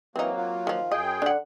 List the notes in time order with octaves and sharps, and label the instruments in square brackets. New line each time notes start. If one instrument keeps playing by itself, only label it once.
[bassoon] E3 [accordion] F#3 A#3 [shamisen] C4 D#4
[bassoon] F4
[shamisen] D#3 F3
[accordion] F#2 G#4 G5 [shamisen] D#5
[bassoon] D3 [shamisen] D4 F#5